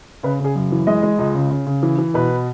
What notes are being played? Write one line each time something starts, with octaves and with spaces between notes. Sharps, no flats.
C#3 B4
C#3 G#4
F#2
E3
G#3 D#5
G#3
C#2
C#3
C#3
C#3
E3
E3
B2 B4